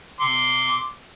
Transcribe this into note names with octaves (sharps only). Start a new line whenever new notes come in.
C6 D6